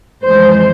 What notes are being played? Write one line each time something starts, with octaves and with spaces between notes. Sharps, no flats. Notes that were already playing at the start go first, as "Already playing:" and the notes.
F2 E3 G#3 C5